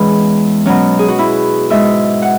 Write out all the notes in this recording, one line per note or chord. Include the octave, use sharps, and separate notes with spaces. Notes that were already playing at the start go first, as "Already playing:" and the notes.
Already playing: E2 E3 G#3 C#4
B2 F#3 C#4
G#4
F#4
E4
G#2 G#3 E5
F#5